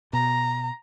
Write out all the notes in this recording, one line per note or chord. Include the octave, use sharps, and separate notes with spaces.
B2 A#5